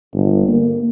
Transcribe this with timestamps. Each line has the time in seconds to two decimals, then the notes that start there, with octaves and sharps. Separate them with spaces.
0.14 G1
0.48 A#3